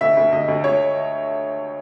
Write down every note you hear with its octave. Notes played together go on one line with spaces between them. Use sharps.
D2 E5
D2
D2 D#5
D2
D2 C#5